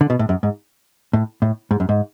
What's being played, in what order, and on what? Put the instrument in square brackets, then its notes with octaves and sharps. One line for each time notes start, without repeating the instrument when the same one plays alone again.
[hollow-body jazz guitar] D3
B2
A2
F#2
G#2
A2
A2
G#2
F#2
G#2